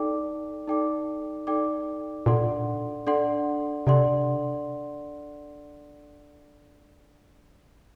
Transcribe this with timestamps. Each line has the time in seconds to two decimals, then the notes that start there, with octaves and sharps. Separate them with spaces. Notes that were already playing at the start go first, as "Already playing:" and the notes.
Already playing: D#4 A4 D5 G5 D6
0.68 D#4 A4 D5 G5 D6
1.47 D#4 A4 D5 G5 D6
2.26 A#2 D4 A4 D5 F#5 C6
3.07 D4 A4 D5 F#5 C6
3.86 C3 D4 A4 D5 F#5 C6